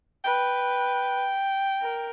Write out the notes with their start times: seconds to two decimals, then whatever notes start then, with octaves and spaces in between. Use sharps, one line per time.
0.24 B4 G5
1.81 A#4